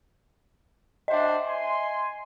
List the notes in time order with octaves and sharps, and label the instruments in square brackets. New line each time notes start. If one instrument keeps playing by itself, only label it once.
[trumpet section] D4 F#4 C5 [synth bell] D#5 E5
[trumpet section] G#5 C6